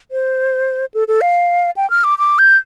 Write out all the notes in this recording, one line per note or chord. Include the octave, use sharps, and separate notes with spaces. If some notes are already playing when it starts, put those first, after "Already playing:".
C5
A4
A4
F5
G5
F6
D6
D6
G6